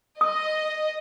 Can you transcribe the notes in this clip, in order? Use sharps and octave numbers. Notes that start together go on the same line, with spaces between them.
D#5 D#6